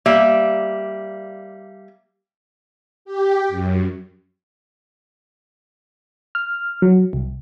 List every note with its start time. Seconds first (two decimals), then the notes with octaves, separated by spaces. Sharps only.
0.06 G3 A#3 E5
3.05 G4
3.48 F#2
6.35 F6
6.82 F#3
7.13 C2